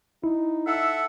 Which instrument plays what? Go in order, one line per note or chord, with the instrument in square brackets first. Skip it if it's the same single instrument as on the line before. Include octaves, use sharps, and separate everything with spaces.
[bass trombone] D#4 [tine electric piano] E4
[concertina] A4 F#5 [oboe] E5